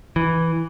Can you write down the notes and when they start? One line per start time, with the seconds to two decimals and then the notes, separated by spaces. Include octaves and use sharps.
0.16 E3